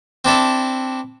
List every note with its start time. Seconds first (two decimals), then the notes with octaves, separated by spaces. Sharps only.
0.25 C4 D4 E4 A4